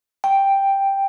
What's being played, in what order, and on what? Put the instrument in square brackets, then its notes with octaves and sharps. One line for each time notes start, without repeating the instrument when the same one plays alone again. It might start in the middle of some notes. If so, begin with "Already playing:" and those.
[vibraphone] G5